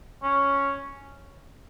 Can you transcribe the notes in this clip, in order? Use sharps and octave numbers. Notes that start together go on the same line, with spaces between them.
C#4